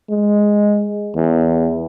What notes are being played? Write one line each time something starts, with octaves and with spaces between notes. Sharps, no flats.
G#3
E2